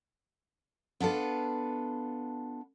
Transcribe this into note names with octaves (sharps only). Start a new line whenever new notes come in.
B3 D4 F4 A4 B4